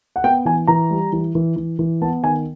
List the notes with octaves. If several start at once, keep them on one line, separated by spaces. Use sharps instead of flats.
F#5
B3 G5
E3 G#5
E3 A#5
G3
E3
E3
E3
E3
B3 A5
D#3 G#5